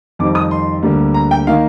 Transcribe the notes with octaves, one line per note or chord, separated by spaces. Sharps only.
F2 D#3 G3 C4 D6
D#6
C6
D2 D3 G3 A#3
A#5
G5
D#3 A#3 F5